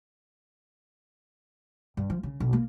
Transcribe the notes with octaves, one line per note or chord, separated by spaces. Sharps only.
G2
F3
C#3
B1
A#3